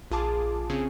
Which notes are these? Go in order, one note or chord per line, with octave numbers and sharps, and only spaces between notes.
A#1 F4 G#4 A5 D6
C#3 C4 C#4 G#4